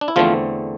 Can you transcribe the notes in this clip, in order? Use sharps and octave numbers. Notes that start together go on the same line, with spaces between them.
D4
E4
E2 D3 F3 A3 C4 F4